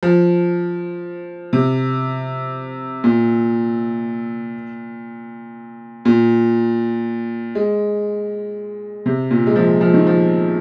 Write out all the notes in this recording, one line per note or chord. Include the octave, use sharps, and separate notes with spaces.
F3
C3
A#2
A#2
G#3
C3
A#2
G#3
F3
F3
D#3
F3